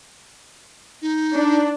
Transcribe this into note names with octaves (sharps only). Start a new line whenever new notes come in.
D#4
D4